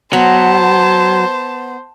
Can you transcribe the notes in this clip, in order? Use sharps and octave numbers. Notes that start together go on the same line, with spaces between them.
F#3 B3 C5 A5